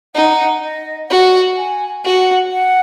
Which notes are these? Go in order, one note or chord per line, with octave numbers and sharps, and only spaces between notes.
D#4 F#5
D#5
F#4 F#5
G#5
F#4 F#5
F#5